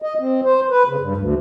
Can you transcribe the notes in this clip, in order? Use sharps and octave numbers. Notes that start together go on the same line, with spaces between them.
D#5
C4
C5
B4
C#3
G2
D2